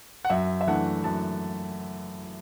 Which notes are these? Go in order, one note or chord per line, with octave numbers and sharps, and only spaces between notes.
F#5
F#2 E5
E5
E3 A3 D4 F#5
F#2 A5